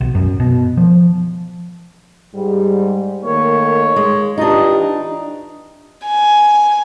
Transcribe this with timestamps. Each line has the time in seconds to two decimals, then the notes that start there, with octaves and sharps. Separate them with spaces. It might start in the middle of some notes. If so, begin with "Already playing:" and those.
0.01 B1
0.15 F#2
0.40 B2
0.77 F3
2.34 G#2 G3
3.24 D#3 A3 A#3 C#5
3.96 G#3
4.38 E3 D4 D#4 F4 G4 D#5
6.06 G#5